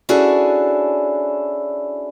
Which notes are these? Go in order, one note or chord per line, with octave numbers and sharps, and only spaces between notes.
C#4 D4 E4 F#4 G#4 A4